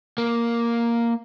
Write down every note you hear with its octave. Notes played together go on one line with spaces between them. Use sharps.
A#3